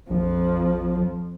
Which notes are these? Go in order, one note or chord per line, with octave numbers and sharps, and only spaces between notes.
A#1 F2 F3